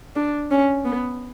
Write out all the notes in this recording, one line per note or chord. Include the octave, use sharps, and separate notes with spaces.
D4
C#4
B3